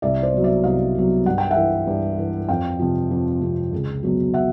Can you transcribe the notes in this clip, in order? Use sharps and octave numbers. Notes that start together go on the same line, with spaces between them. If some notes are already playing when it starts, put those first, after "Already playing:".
C2 D5 E5
C5 D5
B2 F#3
D5 E5
C2 D#5 F5
B2 F#3
G2 F#5
G5
E5 F#5
E3
G2
E3
F2 F5 G5
C3 F3
F2
C3 F3
C#2
B2 F#3
E5 F#5